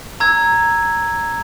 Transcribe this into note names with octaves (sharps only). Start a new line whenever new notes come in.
A#5 E6 G#6